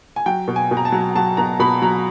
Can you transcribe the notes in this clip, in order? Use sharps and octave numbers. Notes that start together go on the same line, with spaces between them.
G#5
F#3 G5
B2
G#5
B2
A#5
A5
F#3
F#3 A5
B2 A#5
B2 B5
F#3 A#5